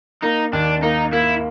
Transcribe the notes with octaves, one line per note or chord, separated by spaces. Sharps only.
A#3 D#4
D#2 D4
A#3 D#4
A#3 E4